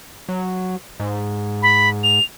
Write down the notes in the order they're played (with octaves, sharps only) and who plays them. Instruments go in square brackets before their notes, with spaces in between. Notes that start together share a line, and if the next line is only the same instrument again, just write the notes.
[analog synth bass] F#3
G#2
[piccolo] B5
F7